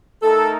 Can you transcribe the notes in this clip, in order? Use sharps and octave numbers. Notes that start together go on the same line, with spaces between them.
A3 D#4 A4 A#4